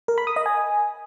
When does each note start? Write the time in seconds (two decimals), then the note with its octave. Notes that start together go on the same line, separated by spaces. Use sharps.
0.08 A#4
0.18 B5
0.27 D#6
0.36 D#5
0.46 G#5